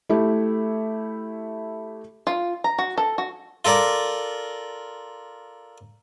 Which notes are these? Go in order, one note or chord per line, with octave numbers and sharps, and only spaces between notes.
A3 E4 G4
F4
A#5
F#4
A4
F#4
F4 A4 A#4 D5